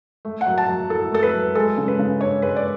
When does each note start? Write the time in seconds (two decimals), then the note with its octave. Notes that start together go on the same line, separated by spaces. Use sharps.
0.25 A3
0.41 F#5
0.46 F#3
0.58 A5
0.68 F#3
0.90 E4 A4
1.12 A3 A4
1.23 B4
1.33 F#3
1.55 G#3 A4
1.78 C#3
1.88 B4
1.99 C#3
2.21 D4 C#5
2.42 G#3 B4
2.56 D5